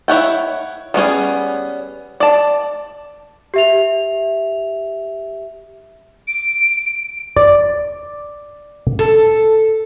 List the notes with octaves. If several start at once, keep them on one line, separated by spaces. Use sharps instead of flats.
E4 C#5 F#5 G5
G3 B3 C#4 G#4
D5 A5
G4 E5 F7
D7
D5
A4